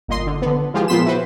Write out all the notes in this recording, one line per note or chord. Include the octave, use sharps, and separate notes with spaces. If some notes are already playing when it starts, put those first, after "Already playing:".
G1 A#2 D#5 C6
D3
D3 B3
E3 F3 G#3 F4 G4 G#4
A#2 F3 B3 C6 B6 E7
E4 F#4 B4 C5